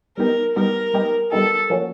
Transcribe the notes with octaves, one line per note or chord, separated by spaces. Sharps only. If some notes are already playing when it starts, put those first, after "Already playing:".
G3 B3 D#4 G4 A#4
G3 B3 D#4 G4 A#4
G3 B3 D#4 G4
G3 B3 D#4 G4 A4
F3 A#3 C#4 F#4